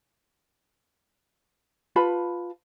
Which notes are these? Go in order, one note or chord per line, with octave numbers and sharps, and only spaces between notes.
F4 B4 A5 B5